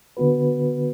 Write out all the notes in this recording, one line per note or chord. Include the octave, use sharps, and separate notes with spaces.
D3 B3 F#4 B4